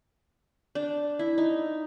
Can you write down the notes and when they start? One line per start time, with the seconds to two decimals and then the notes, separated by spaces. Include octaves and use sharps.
0.75 D4
1.19 E4
1.38 D#4